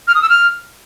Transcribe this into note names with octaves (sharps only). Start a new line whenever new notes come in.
F6
D#6
E6
F6